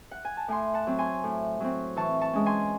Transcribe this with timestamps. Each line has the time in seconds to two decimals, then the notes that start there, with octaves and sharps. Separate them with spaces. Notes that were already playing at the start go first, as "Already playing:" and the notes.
0.11 F#5
0.25 G#5
0.37 A5
0.48 A2 G#5 C6
0.74 F#5 A5
0.87 F#3 C4
0.98 G#5 C6
1.24 A2
1.60 F#3 C4
1.96 E3 A5 C#6
2.21 A5 C#6
2.33 G#3 C#4
2.46 G#5 C6